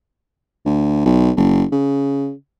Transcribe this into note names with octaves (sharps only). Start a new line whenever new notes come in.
D2
B1
F#1
C#3